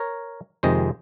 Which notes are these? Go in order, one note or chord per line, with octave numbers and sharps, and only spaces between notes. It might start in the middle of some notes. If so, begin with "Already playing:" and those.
Already playing: A#4 C#5
F2 C3 D#3 G#3 C5 D#5